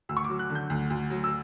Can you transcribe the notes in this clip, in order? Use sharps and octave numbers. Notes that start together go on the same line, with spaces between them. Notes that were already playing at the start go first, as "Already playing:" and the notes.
D2 E6
C#6
D6
F#3
F#6
D3
G6
D2
D2
F#3
E6